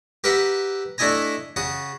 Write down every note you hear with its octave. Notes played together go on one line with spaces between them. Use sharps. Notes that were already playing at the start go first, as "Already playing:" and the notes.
G4 A#4 B4 E5 F#5
A3 D4 E4 D#5 G#5 A#5
C#3 F#4 D#6